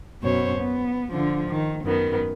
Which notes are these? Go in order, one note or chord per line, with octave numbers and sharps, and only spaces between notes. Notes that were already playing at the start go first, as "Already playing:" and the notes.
F#2 B2 C5 C#5
B3
D3 F3
D#3
F#2 D#3 B3